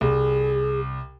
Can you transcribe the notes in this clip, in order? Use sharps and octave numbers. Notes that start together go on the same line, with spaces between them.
C2 G#4